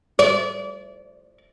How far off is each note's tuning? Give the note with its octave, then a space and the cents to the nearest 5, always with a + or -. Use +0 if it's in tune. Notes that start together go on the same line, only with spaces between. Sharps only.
D5 -30